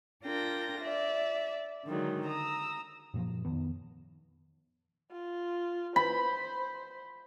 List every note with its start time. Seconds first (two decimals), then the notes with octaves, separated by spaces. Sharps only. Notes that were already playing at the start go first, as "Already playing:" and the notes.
0.23 D4 F4 A#4 G5 A#6
0.80 D5 E5
1.85 D3 D#3 F#3 G#3
2.27 A#5 D#6 E6
3.14 F#2 A#2 F3
3.45 F2 D#3 B3
5.12 F4
5.96 C5 B5